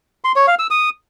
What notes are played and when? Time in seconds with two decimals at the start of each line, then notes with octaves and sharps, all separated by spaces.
0.24 C6
0.36 C#5
0.47 F5
0.59 E6
0.71 D#6